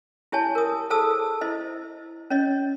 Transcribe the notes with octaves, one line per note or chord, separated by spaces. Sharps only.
E4 G4 C#5 G#5 A5
A#4 D#6
G#4 A4 C5 A5 D#6 E6
E4 C5 D#5
C#4 C#5 D#5